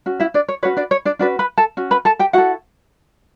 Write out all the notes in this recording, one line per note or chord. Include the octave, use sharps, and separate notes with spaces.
C#4 F#4
E4 E5
D4 D5
C#5
C#4 F#4 B4 C#5
D4 D5
C#5
D4 D5
C#4 D4 F#4 B4 D5
B4 B5
A4 A5
C#4 F#4
B4 B5
A4 A5
G4 G5
E4 F#4 A4 F#5